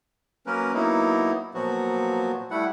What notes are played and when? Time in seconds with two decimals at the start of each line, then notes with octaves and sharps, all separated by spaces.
0.46 F#3 A#3 C#4 A#4 B4
0.74 F#3 A#3 B3 D#4 E4
1.54 A#2 F3 F#3 B3 F#4
2.51 G3 A3 E4 F#5